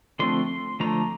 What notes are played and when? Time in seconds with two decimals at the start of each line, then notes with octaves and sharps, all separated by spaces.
0.19 D3 F3 A3 C4 C6
0.80 D3 F3 A3 A#5